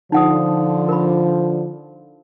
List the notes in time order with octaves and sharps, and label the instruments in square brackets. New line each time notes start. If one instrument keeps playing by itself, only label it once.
[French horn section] D3 F3 [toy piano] D#4 F#5 D#6
[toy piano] A#4 B5